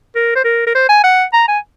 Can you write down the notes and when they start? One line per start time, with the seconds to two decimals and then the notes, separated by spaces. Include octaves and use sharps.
0.15 A#4
0.36 C5
0.44 A#4
0.67 A#4
0.75 C5
0.89 G#5
1.04 F#5
1.33 A#5
1.48 G#5